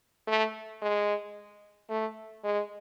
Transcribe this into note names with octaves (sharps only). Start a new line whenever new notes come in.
A3
G#3
A3
G#3